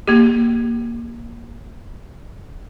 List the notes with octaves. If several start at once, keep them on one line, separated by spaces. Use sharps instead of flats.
A#3 G4